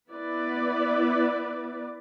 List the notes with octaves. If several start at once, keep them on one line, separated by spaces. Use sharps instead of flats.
B3 E4 B4 D5